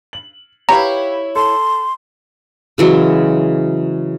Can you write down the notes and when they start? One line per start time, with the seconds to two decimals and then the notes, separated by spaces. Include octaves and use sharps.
0.13 F#7
0.69 E4 G4 B4 C#5 F5 A#5
1.36 A4 C6
2.78 C#3 E3 F#3 G#3